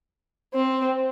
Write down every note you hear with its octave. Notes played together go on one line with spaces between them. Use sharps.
C4